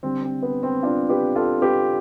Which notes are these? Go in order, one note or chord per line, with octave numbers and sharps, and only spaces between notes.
D3 G3 C4
C4
B3
C4
D4 F4
G4 B4
F4 A4
G4 B4